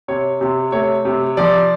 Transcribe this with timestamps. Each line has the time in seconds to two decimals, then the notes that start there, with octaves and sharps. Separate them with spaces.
0.08 C3 C#5
0.41 C3
0.72 A3 C#5
1.05 C3
1.37 F3 D5